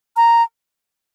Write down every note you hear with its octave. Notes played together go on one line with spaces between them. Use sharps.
A#5